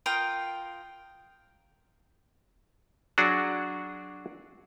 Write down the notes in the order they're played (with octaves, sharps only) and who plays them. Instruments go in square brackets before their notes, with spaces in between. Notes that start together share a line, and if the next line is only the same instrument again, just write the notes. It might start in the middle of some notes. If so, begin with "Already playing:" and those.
[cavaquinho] F4 A#4 G5 D#6
[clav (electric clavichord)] F#3 D4 F#4 G#4